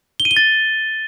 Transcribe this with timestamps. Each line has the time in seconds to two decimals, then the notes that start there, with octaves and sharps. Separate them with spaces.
0.20 G7
0.25 D#7
0.31 G7
0.36 A6